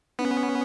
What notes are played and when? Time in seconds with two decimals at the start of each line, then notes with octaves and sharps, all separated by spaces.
0.19 B3 C#4 D#4